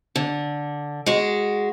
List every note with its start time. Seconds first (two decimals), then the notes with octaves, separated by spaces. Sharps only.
0.16 D3
1.06 G#3 F#4